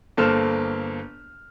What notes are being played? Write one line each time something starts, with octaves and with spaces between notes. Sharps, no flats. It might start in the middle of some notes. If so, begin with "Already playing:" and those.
G1 A#3 A4 C5 F6 E7